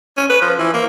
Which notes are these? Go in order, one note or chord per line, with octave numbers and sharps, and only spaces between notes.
C#4
B4
F3
E3
A#3